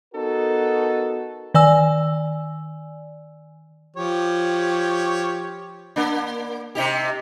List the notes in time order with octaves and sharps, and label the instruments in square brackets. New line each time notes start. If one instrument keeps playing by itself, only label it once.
[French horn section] B3 D#4 F#4 A4 A#4
[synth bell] D#3 D5 G#5 E6
[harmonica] F3 G4 C#5
[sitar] A#3 D4
C3 D#4 G4